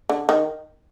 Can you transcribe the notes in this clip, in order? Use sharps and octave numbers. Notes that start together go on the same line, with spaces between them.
D3
D#3